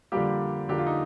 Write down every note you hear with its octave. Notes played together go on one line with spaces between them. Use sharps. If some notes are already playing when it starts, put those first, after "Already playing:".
D3 F3 G3 A#3 G4
D3 F3 A#3 G4
F4
D#4